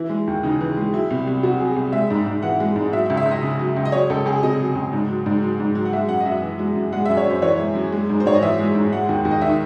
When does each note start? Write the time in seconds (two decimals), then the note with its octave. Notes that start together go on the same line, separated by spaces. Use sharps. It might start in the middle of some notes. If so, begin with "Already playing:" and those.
Already playing: E3 E4
0.09 G#3
0.27 D#2
0.43 C#3 D#4
0.61 E3
0.77 G#3
0.93 F#3 E4
1.10 C2
1.27 C2
1.43 C3 F#4
1.60 F#3 G#4
1.76 C2
1.93 G#3 E5
2.10 G#2
2.26 G#2
2.42 E3 F#5
2.60 G#3
2.76 G#2
2.93 F#3 E5
3.06 E5
3.10 C#2
3.17 E5
3.26 C#2
3.31 D#5
3.43 C#3
3.59 F#3
3.76 C#2
3.85 D#5
3.92 F#3 C#5
4.10 C#2 A4
4.26 C#2 G#4
4.43 C3 D#5
4.59 F#3
4.75 C#2
4.93 G#2
5.09 F#3
5.26 G#2
5.43 F#3
5.60 G#2
5.75 F#3
5.85 F#5
5.93 G#3 E5
6.09 F#2 F#5
6.20 D#5
6.26 F#2 E5
6.42 E3
6.59 G#3
6.75 F#2
6.93 G#3 F#5
7.06 E5
7.09 F#2
7.17 C#5
7.26 F#2 C5
7.42 E3 C#5
7.59 G#3
7.75 F#2
7.92 G#3
8.10 G#2
8.20 C5
8.26 G#2 C#5
8.34 D#5
8.42 E3 E5
8.59 G#3
8.75 G#2
8.93 G#3 F#5
9.09 D#2
9.25 D#2
9.31 D#5
9.42 D#3 E5